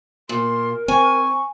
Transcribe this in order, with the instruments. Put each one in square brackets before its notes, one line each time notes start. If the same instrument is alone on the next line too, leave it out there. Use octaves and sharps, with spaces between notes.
[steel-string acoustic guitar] A#2 [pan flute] A#4 [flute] C6
[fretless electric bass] C4 [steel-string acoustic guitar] G#5 [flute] C#6